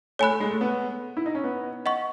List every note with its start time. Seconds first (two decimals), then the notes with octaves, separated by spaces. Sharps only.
0.19 A3 C#5 G#5 B5 F#6
0.30 A3
0.40 G#3
0.51 A3
0.61 B3
1.17 E4
1.26 D#4
1.35 C#4
1.44 B3
1.86 D#5 F#5 C#6